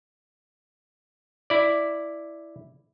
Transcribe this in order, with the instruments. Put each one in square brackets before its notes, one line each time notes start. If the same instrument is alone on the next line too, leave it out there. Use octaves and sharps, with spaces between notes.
[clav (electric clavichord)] E4 D5